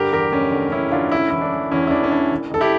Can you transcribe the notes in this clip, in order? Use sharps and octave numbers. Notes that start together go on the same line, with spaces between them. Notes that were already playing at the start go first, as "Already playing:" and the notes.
Already playing: G2 D3 G4 A#4
E2 G4 A#4
F1 C#4
D3
D3 C#4 E4
D3 D4 F4
E1 C#4 E4
E3 E4
D4
E3
E2 C#4 E4
E4
E3 D4
C#4
E1 D4
E1
E1 A4
E4 G4